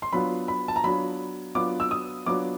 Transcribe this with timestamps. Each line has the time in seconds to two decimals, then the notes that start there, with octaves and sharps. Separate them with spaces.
0.02 C6
0.13 F#3 B3 D4 F4 B5
0.48 B5
0.68 A5
0.76 A#5
0.84 F#3 B3 D4 F4 B5
1.55 F#3 B3 D4 F4 D6
1.80 E6
1.91 D#6
2.26 F#3 B3 D4 F4 D6